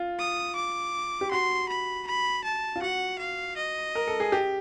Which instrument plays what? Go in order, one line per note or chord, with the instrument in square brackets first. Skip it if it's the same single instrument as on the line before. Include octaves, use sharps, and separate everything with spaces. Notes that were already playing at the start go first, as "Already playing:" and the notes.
Already playing: [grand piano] F4
[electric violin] D#6
D6
[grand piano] G4
[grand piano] F#4 [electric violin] C6
[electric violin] B5
B5
A5
[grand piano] F4
[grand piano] F#4 [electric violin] F#5
[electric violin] F5
D#5
[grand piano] A#4
A4
G#4
G4